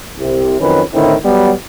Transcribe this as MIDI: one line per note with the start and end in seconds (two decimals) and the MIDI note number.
0.18 0.59 36
0.18 0.59 48
0.60 0.82 41
0.60 0.82 51
0.60 0.82 54
0.60 0.82 61
0.60 0.82 71
0.94 1.14 45
0.94 1.14 50
0.94 1.14 51
0.94 1.14 60
0.94 1.14 64
1.25 1.52 54
1.25 1.52 55
1.25 1.52 59